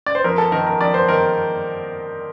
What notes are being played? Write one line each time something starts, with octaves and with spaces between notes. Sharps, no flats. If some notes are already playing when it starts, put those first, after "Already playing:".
D5
C5
F2 A#4
A4
D#3 A#4
A#4
F2 D5
C5
D#3 A#4